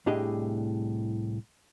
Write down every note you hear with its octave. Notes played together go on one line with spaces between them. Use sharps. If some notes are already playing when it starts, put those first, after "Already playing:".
C2 A2 D4 G4 G#4 D#5